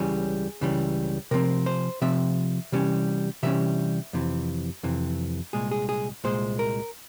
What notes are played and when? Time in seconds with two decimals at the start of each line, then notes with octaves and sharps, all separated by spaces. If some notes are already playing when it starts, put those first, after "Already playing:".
Already playing: C#2 C#3 E3 G3 G#4
0.61 C#2 C#3 E3 G3
1.31 C3 F3 C4 A#4
1.66 C5
2.01 C3 F3 C4 E5
2.72 C3 E3 G3 C#4
3.43 C3 E3 G3 C#4 E5
4.13 F2 C3 E3
4.83 F2 C3 E3
5.53 C2 A#2 G#3 G#4
5.71 G#4
5.89 G#4
6.24 C2 A#2 G#3 C5
6.59 A#4